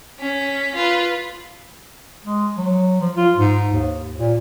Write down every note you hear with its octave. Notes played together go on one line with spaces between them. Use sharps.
C#4 B6
F4 B4
G#3
F#3
F3
F4
G#2
D#2
A#2